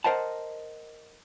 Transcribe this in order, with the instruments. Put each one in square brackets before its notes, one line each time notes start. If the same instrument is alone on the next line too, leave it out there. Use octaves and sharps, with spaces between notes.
[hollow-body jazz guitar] A#4 C5 D#5 F#5 A5